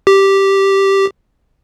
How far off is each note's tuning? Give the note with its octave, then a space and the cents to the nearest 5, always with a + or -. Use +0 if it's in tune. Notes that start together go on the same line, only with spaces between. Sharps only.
G4 -5